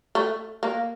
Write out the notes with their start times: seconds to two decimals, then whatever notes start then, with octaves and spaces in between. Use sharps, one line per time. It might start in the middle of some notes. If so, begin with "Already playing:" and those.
0.15 A3
0.63 A#3